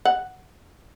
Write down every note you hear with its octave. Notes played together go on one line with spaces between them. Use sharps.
F#5